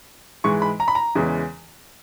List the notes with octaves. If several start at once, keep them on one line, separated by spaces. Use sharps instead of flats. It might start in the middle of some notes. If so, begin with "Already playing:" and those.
G#2 E3 G#3 C#6
B5
A#5
B5
A#5
E2 C#3 E3 G#3